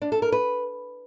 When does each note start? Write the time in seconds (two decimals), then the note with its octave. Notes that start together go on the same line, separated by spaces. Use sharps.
0.02 D4
0.12 A4
0.22 A#4
0.32 B4